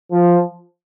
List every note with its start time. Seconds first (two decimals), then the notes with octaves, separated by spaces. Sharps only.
0.11 F3